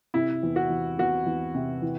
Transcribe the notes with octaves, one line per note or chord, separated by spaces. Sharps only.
C3 E4
E2
F#4
E2
E2 F#4
E2
C3
E3